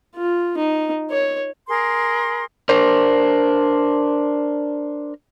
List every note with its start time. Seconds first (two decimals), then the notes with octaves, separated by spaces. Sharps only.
0.16 F4
0.58 D#4
1.11 C#5
1.68 G#4 A#4 C6
2.69 D4 A#4 C5